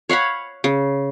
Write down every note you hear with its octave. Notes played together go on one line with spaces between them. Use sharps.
C#5 F5 F#5 B5
C#3